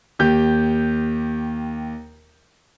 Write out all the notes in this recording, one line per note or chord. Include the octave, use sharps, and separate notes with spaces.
D#2 G4 G6